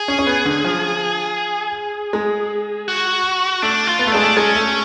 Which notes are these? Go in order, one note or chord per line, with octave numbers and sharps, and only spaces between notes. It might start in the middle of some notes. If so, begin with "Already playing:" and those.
Already playing: G#4
C#4
C#4
B3
D3
F3
G#3
F#4
A3 D4
F4
B3
A3
G#3 D4
A3
G#3 C#4
A3